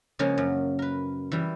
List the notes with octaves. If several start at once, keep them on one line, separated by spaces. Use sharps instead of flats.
C#3 F3 G#3 A#3 C#4
F#2
A#4 B4
E3 G3